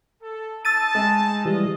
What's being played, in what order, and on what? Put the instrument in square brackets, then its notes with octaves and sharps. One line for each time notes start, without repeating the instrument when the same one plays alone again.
[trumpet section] A4
[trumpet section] D#4 A5 [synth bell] E6 A6 D#7
[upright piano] G#3
[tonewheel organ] E3 G3 [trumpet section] F4 D#5